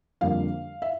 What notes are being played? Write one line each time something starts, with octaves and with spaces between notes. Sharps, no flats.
F2 D3 G3 A#3 F5
E5